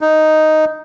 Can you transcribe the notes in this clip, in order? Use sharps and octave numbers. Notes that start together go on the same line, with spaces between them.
D#4